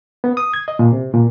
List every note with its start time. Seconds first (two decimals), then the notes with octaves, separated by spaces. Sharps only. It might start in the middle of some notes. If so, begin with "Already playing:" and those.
0.24 B3
0.37 D#6
0.54 G#6
0.68 D#5
0.79 A#2
0.93 C3
1.13 A#2